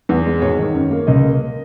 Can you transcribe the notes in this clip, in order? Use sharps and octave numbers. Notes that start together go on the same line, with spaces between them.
E2
G#3
G#1 C#5
D#3
F#2
A#3
C#2 D#5
A#3